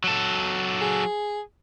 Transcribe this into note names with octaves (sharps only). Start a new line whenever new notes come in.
F#3 A4
G#4